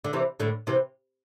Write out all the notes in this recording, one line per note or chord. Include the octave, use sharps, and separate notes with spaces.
D3
C3 E3
A2 D3
C3 E3